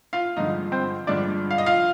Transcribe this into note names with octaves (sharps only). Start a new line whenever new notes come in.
F4 F5
G2 D3 F3 G#3 D#4 D#5
C4 C5
G2 D3 F3 G#3 D4 D5
F5
D#5
F4 F5